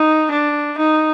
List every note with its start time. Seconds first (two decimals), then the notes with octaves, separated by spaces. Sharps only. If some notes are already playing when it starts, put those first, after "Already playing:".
Already playing: D#4
0.31 D4
0.78 D#4